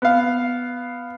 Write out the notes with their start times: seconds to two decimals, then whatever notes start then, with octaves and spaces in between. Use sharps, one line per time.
0.02 B3 F5